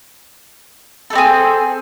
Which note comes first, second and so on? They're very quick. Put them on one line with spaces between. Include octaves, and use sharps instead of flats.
A4 A3 C4 G#4